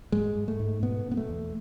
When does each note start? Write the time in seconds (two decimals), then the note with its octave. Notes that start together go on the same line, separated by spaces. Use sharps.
0.12 G#2 G#3
0.35 G#2
0.48 A3
0.59 G#2
0.83 B2 B3
1.06 B2
1.11 B3
1.17 A3
1.29 E2